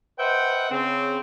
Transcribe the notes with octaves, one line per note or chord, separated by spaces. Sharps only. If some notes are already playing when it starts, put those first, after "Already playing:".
B4 C5 D#5 E5 F#5 G5
C#3 C4